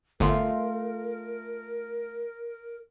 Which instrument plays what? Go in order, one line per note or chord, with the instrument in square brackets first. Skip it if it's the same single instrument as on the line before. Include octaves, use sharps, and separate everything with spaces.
[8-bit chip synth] G1 [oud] A3 F4 [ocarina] A#4